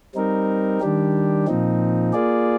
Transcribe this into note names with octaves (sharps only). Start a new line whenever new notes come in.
G3 C4 D#4 A#4
D#3 G3 D4 G4
A#2 F3 C4 D#4
A#3 F4 G#4 D5